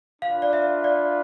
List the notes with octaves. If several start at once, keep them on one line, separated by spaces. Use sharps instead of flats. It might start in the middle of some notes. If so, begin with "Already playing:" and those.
D4 F4 B4 F5
D5
E5
D5